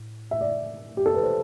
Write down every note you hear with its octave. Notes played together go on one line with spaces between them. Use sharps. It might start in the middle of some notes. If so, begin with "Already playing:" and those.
Already playing: A2
E5
D5
G4
A4
B4
C5